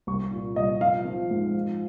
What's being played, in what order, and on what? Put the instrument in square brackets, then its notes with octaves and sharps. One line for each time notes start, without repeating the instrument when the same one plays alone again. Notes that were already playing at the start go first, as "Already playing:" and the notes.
[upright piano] C2 C#6
A#2
C2 D#5
F3 F5
F3
G#2
F3